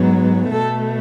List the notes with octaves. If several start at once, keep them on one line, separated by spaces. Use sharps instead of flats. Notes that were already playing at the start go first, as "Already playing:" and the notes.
Already playing: G#2 F#3 B3
B2 A3 A4